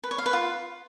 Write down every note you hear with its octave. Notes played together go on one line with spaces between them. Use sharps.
B4
C#5
F5
B4
F4